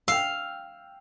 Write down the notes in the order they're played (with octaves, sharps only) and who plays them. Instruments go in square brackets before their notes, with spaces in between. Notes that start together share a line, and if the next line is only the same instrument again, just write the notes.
[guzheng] F5 [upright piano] G5 E6